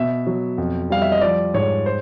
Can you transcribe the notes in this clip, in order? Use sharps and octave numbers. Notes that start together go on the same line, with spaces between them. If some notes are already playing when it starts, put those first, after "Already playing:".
Already playing: B2 E5
F#3
F2
G3 F5
E5
D#5
F3 D5
G#2 C#5
C5